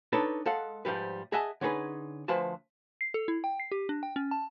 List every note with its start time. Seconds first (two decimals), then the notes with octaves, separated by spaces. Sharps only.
0.13 D4 D#4 A4 B4 C#5 A5
0.46 G#3 A4 F5 F#5
0.85 G#2 F3 G3 B4
1.32 G#4 D#5 E5 F#5 G#5 A5
1.61 D3 C#4 D#4 G#4 B4
2.28 D2 F3 B4 C5 G#5 A5
3.01 C7
3.14 A4
3.28 E4
3.44 G5
3.60 C7
3.72 G4
3.89 D4
4.03 G5
4.16 C#4
4.31 A5